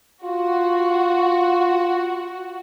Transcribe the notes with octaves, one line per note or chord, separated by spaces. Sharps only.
F4 F#4